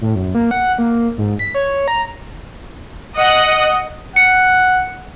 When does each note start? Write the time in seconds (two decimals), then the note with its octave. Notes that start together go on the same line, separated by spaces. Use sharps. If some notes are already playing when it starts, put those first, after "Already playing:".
0.01 A2
0.15 F#2
0.35 A#3
0.51 F#5
0.78 A#3
1.18 G#2
1.39 B6
1.54 C#5
1.88 A#5
3.15 D#5 F#5
4.16 F#5 C#7